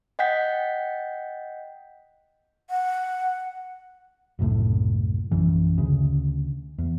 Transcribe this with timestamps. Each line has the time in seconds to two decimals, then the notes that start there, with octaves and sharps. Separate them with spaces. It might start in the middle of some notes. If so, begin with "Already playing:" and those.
0.19 D#5 F#5 G5 G6 B6
2.70 F#5
4.39 F#1 C2 F#2 A2
5.31 A#1 F#2 E3
5.78 D2 C#3
6.78 E2